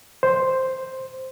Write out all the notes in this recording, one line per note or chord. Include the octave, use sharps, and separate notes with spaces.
C5